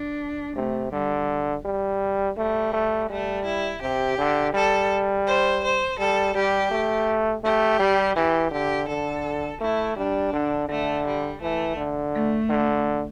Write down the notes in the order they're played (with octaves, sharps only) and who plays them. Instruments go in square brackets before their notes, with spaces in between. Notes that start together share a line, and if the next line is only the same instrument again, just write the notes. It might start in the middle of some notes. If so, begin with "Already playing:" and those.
Already playing: [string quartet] D4
[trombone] C3 [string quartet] A3
[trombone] D3 [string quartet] G3
[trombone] G3
[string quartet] G3 [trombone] A3
[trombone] A3
[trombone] G3 [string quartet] A3
[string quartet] E4
[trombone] C3 [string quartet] G4
[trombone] D3
[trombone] G3 [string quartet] A4
[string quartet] C5
C5
[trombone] G3 [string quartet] A4
[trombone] G3 [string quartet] G4
[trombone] A3
[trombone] A3 [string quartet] G4
[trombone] G3
[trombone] E3 [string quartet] G4
[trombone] D3 [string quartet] G4
[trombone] D3 [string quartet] A4
[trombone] A3 [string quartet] E4
[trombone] G3 [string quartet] D4
[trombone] D3
[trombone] D3 [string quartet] A3
[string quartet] G3
[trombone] E3 [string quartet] A3
[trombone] D3
[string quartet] A3
[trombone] D3